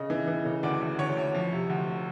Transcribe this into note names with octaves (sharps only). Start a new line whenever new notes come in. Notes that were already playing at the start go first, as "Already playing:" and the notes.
Already playing: C#3 D#5
E3
E3
C#3
D2 D5
D2
D2 C#5
D2
F3
C3
D2